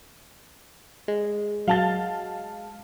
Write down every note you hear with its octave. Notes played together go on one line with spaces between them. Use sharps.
G#3
F#3 F5 A5 A6